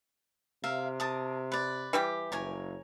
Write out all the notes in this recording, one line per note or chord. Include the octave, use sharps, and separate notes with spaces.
C3 A#4 E5 F5
A#4 A5 D#6
B4 D5
E3 G3 G4
F#1 A#4 C#5 G#5